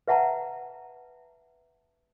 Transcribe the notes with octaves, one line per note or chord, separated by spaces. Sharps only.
B4 E5 F#5 A5 A#5